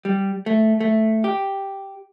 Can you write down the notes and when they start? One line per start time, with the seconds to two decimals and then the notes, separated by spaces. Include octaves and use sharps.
0.05 G3
0.46 A3
0.80 A3
1.24 G4